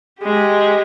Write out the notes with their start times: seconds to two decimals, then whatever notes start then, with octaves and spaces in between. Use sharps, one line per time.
0.21 G#3 G4